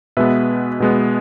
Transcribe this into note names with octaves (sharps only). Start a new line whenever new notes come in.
B2 G#3 B3 B4 E5
B2 G#3 B3